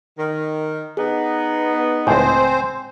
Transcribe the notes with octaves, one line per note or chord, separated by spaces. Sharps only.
D#3
B3 D#4 G#4
C#2 A2 C4 C5 G#5